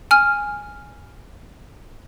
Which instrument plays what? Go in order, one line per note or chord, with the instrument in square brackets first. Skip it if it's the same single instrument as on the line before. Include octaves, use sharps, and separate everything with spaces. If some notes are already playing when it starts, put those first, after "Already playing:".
[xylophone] G#5 F6